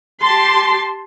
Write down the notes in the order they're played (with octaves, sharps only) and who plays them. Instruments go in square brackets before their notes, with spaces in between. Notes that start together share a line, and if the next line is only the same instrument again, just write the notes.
[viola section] G4 A5 C6